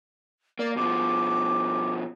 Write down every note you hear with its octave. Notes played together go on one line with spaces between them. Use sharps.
A#3 D5
B2 F3 D6